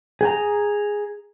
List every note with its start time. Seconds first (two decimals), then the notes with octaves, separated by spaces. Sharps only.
0.21 G#4 G5 A#5